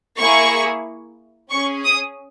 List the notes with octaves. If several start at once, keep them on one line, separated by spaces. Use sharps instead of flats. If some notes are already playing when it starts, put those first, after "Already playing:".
A#3 E4 G#4 C#6
C#4 G#4 C#6
D#6